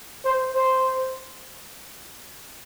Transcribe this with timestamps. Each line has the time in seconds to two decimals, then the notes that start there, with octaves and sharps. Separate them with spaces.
0.25 C5
0.54 C5